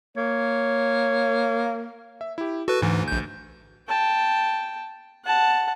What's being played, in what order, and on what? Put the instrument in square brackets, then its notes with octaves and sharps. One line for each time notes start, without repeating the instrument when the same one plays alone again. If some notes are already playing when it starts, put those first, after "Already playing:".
[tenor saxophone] A#3 [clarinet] C#5
[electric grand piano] E5
E4 G4
[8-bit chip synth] F#4 B4 [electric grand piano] A4
[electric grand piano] D2 [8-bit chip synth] G#2 E3
[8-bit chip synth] A#1 G6
[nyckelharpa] G5 A5
F#5 A5